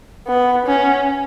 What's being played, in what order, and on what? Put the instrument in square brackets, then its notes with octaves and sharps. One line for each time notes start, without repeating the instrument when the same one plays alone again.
[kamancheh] B3
C#4